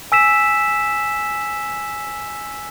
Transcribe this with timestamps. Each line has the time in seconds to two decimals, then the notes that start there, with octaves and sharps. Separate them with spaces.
0.12 G#5 E6 B6 E7